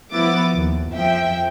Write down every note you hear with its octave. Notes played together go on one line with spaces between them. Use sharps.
F3 B3 E4 D6 A6
D#2
F2 F3 E5 G5